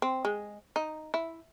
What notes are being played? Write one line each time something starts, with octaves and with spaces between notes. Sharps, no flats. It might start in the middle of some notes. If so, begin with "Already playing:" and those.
C4
G#3
D#4
E4